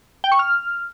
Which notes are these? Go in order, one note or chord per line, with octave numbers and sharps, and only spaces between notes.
G5
C#6
F6